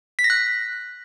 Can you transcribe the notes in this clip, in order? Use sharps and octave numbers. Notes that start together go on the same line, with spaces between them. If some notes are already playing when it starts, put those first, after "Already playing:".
B6
A#6
F#6